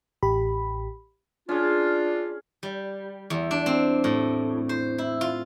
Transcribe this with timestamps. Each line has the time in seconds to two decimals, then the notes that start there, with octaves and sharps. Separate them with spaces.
0.23 A1 G4 B5
1.49 C#4 D4 F4 G#4
2.63 G3
3.30 E2
3.51 D4
3.66 C4
4.04 A2
4.69 C5
4.98 E4
5.21 F4